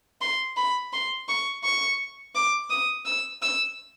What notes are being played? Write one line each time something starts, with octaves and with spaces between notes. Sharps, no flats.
C6
B5
C6
C#6
C#6
D6
D#6
E6
E6